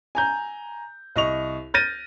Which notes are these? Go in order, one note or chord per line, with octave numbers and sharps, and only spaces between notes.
G#5 A#5 G6
C2 D#5 C#6 F7
F6 G6 A6 A#6 D#7